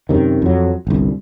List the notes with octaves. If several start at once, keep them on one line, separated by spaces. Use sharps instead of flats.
F#2 C3 D#3
F2 F#3
G1 C2